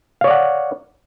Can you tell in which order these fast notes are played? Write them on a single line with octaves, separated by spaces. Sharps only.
F5 C#5 D5 F#5